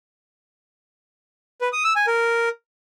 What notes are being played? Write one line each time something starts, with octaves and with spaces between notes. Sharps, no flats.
B4
D#6
E6
G#5
A#4